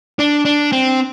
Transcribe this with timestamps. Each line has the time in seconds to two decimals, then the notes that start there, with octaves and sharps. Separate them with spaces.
0.19 D4
0.45 D4
0.72 C4